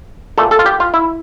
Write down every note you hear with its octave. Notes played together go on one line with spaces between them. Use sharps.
A#2 A3 A4
A4
F4
G4
F4
E4